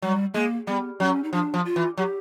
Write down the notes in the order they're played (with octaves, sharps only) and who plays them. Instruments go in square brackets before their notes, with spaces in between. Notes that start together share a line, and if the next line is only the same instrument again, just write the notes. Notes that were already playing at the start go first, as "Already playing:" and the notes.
[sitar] F#3 [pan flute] G3
[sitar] G#3 [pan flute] A#3
[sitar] G3 [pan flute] B3
[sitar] F#3 [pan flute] C#4
[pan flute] D#4
[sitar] F3 [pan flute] D4
[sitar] F3
[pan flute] F4
[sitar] E3
[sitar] F#3 [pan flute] G4